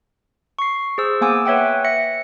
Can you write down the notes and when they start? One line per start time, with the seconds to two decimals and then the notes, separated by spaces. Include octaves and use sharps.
0.59 C#6 C7
0.98 G#4 C5 E6
1.21 A#3 B3 G#5 D6 E6
1.46 B4 C#5 E5 F#5 G5
1.85 E5 A#6 C#7